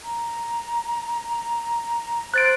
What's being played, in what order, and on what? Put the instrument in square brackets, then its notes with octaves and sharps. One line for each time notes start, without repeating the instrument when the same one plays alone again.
[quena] A#5
[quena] C5 [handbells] F#6 A6 D7